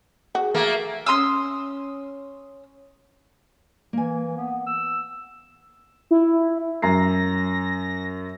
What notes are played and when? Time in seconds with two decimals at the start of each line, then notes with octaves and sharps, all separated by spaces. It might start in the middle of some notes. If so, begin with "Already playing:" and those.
0.35 F#4 G#4
0.54 A3 A#3
1.06 C#4 C6 D#6 E6
3.93 E3 A#3 G#5
4.37 B3
4.67 E6
6.11 E4
6.82 F#2 A#5 A#6 C7